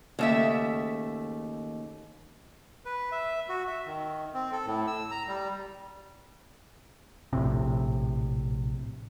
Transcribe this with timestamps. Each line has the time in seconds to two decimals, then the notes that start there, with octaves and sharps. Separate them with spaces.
0.19 D#2 C#3 A3 E5
2.85 B4
3.12 E5
3.49 F#4
3.67 E5
3.86 D#3
4.34 C4
4.52 A4
4.66 A2
4.87 E6
5.11 A#5
5.28 G3
7.33 A#1 A2 C3